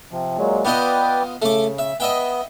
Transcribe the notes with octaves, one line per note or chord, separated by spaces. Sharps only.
C3 F3
A#2 F#3 G#3
B3 F4 B4 D5 D#5 G5
C#3 A3 D6
E5
B3 D#5 E5 G5